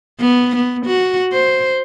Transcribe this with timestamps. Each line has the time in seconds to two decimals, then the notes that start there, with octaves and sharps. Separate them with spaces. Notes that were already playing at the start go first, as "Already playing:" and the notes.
0.21 B3
0.56 B3
0.86 F#4
1.33 C5